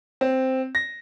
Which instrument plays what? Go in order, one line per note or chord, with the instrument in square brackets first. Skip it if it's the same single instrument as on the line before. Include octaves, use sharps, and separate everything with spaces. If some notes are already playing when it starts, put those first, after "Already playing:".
[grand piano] C4
A#6